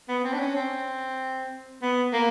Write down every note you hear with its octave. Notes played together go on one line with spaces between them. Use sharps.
B3
C4
D4
C#4
C4
B3
A#3